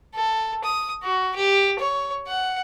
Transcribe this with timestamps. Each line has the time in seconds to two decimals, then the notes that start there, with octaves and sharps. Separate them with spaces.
0.15 A4
0.64 D#6
1.03 F#4
1.36 G4
1.79 C#5
2.27 F#5